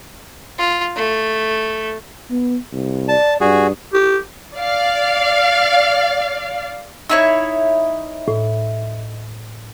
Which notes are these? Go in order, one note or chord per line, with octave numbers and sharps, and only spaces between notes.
F4
A3
B3
C2
D5 A5
G2 F#4 G#4 D5
G4
D5 F5
D#4 E4 C#5 E6
A2